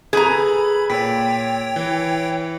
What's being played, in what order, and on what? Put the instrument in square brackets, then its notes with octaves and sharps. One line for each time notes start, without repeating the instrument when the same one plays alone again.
[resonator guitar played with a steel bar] G#4 A#5 [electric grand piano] A4 B4 [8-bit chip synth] B5
[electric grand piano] A#2 B6 [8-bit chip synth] C#5 G5
[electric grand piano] E3